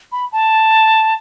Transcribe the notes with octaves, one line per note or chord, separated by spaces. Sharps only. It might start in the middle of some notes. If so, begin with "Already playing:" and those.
B5
A5